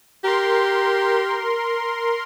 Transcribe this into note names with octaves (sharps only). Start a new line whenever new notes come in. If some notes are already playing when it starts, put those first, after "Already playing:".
G4 A#4 C6